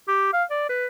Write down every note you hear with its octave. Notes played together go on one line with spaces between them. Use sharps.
G4
F5
D5
B4